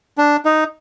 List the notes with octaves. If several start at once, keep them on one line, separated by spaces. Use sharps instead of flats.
D4
D#4